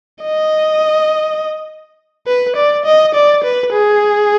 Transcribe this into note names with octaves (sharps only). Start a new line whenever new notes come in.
D#5
B4
D5
D#5
D5
B4
G#4